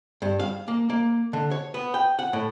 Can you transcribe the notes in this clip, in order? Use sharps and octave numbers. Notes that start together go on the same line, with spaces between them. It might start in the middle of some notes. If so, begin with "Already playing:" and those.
G2
F5
A#3
A#3
D3
C#5
B3
G5
F#5
A2